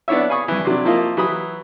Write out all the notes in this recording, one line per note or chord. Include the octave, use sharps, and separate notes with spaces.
B3 D4 E4 C#5 E5
F5 G#5 B5 C#6 D#6
G2 E3
C3 F#3 D4
F3 A#3 E4 F4 D#5
E3 F#3 B5 D#6